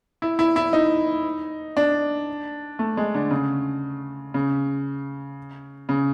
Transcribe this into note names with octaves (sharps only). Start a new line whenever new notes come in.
E4
E4
E4
D#4
D4
A3
G#3
D3
C#3
C#3
C#3